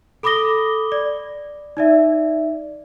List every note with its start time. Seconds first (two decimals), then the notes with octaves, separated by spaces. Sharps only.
0.23 A4 B5 D6 D#6 A#6 G7
0.92 D5
1.77 D#4 D5 E5